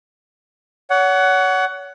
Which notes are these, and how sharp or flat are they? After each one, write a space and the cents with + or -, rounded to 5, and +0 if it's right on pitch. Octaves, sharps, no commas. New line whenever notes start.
C#5 +35 F#5 +10